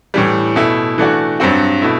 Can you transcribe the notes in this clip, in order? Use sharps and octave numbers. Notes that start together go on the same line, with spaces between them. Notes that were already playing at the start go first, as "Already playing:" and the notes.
A2 E3 G3
B2 A3 E4
E3 A3 D4 F#4
G2 F#3 C4 F#4
B2 A3 E4